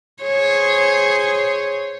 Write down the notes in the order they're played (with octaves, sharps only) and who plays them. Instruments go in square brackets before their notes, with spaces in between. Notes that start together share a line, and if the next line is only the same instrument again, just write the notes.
[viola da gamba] G#4 C5 C#5